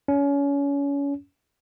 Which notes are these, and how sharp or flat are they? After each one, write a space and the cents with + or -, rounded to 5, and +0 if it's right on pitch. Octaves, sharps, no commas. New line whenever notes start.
C#4 +30